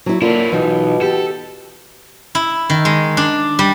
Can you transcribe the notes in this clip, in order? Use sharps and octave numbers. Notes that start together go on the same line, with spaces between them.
F#3 E4
D3 F#3 A#3 E4 F4
B1 B2 E3 D#4
G4 A4
E4
D#3
G#3
D4
G3